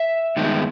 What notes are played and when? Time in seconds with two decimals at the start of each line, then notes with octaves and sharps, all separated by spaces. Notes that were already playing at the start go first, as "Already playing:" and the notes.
Already playing: E5
0.36 G2 D#3 G#3 B3 D#4